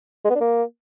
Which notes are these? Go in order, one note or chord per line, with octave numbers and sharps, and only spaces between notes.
G#3
B3
D4
A#3